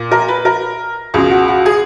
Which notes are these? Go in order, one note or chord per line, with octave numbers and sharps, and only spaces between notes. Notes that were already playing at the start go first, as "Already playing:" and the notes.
Already playing: A#2
A#4
B4
A#4
C#2 B2 G#4
F#4
F#4
G#4